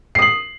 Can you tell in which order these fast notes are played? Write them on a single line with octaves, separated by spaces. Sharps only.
C7 D#6 F#7